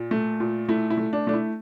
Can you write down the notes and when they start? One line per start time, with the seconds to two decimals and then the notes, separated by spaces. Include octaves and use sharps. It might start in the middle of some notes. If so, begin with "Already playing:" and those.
Already playing: A#2
0.11 A3
0.40 A#2
0.69 A3 E4
0.90 E4
0.98 A3
1.13 D4
1.27 A3 D4
1.34 E4